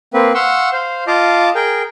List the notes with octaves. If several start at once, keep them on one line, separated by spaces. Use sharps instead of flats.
A#3 C4 B4
F5 F#5 C6 C#6 E6
C5 F5
F4 D#5 F5 A5 D6
G#4 A#4 G5